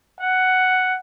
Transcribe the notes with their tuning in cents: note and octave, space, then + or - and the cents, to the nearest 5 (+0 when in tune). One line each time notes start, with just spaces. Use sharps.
F#5 +5